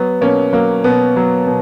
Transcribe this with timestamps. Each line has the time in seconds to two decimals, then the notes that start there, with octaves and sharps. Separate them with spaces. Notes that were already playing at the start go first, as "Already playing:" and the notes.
Already playing: F#3 B3
0.21 B2 A#3 C#4
0.53 F#3 A#3
0.84 B2 B3
1.17 F#3
1.47 B2